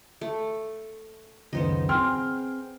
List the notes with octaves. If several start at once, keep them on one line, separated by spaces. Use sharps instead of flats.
A3
C#2 F#2 D#3 B3 C5 D#5
C4 G#4 G5 C6 F6